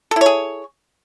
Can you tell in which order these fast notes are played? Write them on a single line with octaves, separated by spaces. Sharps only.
A4 E4 C#5 G#4